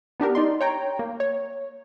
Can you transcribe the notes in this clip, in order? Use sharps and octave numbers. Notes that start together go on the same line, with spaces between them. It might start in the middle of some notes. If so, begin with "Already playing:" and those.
B3 D4 G4 A#4
D#4 D5 C6
C#5 G5 A#5
A#3
C#5